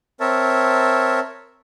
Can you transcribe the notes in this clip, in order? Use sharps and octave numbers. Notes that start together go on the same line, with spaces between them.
C4 A#4 C#5 E5 A5